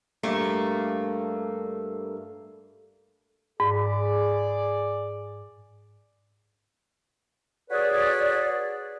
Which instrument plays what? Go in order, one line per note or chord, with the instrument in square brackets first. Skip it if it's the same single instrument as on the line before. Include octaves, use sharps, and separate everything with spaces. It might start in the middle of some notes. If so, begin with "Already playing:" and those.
[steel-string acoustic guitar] G2 A3 A#3
[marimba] G#2 [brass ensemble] G#4 D5
[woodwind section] F#4 G#4 A4 B4 C#5 D5